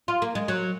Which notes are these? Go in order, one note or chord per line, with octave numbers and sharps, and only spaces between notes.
F4
A#3
G#3
F#3